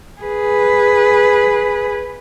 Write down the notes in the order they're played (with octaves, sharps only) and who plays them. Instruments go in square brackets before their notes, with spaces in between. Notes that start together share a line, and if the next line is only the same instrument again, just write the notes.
[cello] G#4 B4